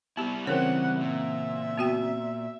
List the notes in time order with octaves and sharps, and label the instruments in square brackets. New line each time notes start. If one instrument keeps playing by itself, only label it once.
[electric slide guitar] G3 E4 [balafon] B3 G4
[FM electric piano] C#3 E3 C4 [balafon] A#4 C#5 [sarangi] F#5
[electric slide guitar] A#2 [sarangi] E5
[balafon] B3 F#4 G5